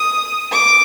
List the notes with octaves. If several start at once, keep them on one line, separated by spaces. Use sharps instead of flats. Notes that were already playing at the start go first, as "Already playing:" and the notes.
Already playing: D#6
D6